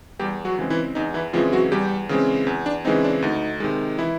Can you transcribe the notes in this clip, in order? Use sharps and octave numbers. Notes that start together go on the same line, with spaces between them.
E2 G3 G4
F#3 F#4
C#3 E3 G#3 C4
E3 E4
E2 D#4
E3 E4
C#3 E3 F3 G#3 C4 F4
F#3 F#4
E2 G3 G4
C#3 E3 G#3 C4
E2
D4
C#3 E3 G#3 C4 D#4
D4
D2 D#4
C3 D#3 G#3
E3 E4